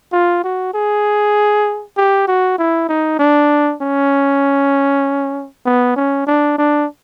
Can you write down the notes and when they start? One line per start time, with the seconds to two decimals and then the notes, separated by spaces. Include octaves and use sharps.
0.13 F4
0.44 F#4
0.74 G#4
1.97 G4
2.28 F#4
2.58 E4
2.89 D#4
3.19 D4
3.81 C#4
5.65 B3
5.96 C#4
6.27 D4
6.58 D4